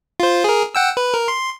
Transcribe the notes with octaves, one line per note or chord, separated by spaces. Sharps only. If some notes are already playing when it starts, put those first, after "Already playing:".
F4 C5
G#4 A#4
F#5 G5 E6
B4
A#4
C6